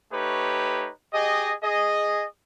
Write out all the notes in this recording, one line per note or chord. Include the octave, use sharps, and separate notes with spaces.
A3 D#4 G4 B4 C#5
G4 G#4 D#5
G#4 D#5